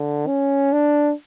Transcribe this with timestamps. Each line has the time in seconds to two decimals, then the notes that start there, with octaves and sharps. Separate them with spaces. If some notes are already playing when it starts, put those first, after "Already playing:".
Already playing: D3
0.27 C#4
0.72 D4